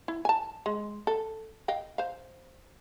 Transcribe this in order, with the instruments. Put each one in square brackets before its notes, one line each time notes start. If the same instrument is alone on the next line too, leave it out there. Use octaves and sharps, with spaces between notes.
[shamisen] E4
G#5 A5
G#3
A4
D#5 F5 G5
C5 F5